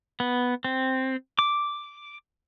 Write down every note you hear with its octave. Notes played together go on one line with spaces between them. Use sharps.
B3
C4
D6